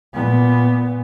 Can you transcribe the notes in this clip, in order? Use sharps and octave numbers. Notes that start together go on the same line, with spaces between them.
A#2 B3